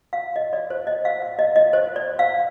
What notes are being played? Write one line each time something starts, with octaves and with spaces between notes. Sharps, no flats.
F5
D#5
D5
C5
D#5
F5
F5
D#5
D#5
C5
D5
F5